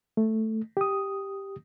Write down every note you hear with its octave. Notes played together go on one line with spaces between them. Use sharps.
A3
G4 D#6